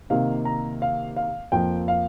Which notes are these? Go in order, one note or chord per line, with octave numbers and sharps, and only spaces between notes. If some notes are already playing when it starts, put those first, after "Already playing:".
C3 D#3 A#3 F5
A#5
F5
F5
F2 F3 A#3 G5
F5